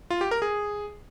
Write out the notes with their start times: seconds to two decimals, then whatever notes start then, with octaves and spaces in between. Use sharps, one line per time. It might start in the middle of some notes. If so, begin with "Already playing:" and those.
0.11 F4
0.21 G4
0.31 A#4
0.42 G#4